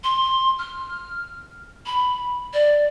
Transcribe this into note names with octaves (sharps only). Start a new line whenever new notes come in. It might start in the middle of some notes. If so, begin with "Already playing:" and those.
C6
F6
B5
D5